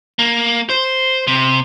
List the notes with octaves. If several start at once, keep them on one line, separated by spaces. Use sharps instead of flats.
A#3
C5
C3